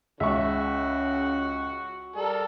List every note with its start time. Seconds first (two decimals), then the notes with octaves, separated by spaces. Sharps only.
0.20 C#2 C#3 F#4 E5 C#6
2.16 G3 A4 A#4